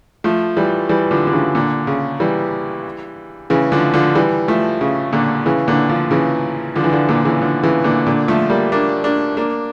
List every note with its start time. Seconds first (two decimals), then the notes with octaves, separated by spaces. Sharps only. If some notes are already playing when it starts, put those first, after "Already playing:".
0.24 F3 A3
0.57 E3 G3
0.89 E3 G3
1.11 D3 F3
1.27 D3
1.33 C#3 E3
1.55 A#2 D3
1.87 C#3
2.20 E3 G3
3.50 C#3 E3
3.72 D3 F3
3.94 D3 F3
4.15 E3 G3
4.48 F3 A3
4.81 C#3
5.13 A#2 D3
5.46 C#3 E3
5.68 A#2 D3
5.89 D3 F3
6.11 C#3 E3
6.76 D3 F3
6.84 E3
6.92 D3 F3
7.09 A#2 D3
7.25 C#3 E3
7.41 D3 F3
7.64 C#3 E3
7.84 A#2 D3
8.07 A#2 D3
8.28 F3 A3
8.50 G3 A#3
8.72 A#3 D4
9.04 A#3 D4
9.37 A#3 D4